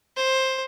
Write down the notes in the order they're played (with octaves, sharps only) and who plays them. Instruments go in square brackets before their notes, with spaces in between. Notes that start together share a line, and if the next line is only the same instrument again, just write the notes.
[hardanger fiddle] C5